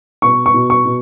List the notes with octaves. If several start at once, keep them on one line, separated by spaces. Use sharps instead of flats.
B2 C#6
C#6
B2
C#6
B2